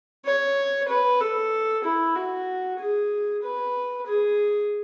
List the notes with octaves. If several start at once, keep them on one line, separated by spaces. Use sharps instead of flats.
C#5
B4
A4
E4
F#4
G#4
B4
G#4